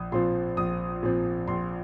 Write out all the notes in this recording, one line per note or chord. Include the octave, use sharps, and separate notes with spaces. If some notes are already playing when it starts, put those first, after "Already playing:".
Already playing: A#1 D#6
A#2 F3 C4 C6
A#1 D#6
A#2 F3 C4
A#1 C6